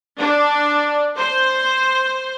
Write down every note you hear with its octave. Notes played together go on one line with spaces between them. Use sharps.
D4
C5